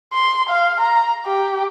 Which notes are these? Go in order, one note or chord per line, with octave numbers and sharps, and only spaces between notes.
C6
F5
A#5
G4